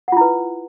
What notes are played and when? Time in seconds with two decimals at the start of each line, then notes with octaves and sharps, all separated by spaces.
0.08 F#5
0.12 F4
0.17 E4
0.21 B4